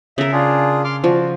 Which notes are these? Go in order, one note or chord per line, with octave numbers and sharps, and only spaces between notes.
C#3 A#4 E5
D4 F4 G#4
C6 D6 F6
F3 F#4 D5